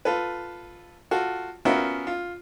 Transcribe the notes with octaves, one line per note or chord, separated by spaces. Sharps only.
F4 A4 B4
F4 F#4 A4
B3 C#4 F4 F#4 A#4 E5
F4